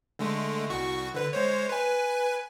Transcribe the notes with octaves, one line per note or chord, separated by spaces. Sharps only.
D3 G#3 A3
C2 F#4 C#6
D3 B4
G#3 C5 C#5
B4 G#5